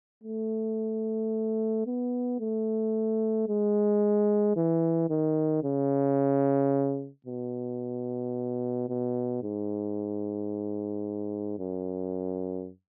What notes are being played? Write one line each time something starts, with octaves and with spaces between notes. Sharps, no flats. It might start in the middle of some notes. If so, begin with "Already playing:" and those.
A3
B3
A3
G#3
E3
D#3
C#3
B2
B2
G#2
F#2